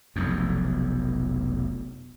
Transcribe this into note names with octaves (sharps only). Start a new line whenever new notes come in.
F1 B1 F2